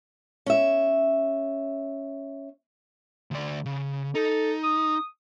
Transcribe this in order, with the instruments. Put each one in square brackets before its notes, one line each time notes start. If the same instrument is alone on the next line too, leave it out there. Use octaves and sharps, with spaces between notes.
[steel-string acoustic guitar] C#4 E5
[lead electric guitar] D2 D5
C#3
[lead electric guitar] D#4 [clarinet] A4
[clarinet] D#6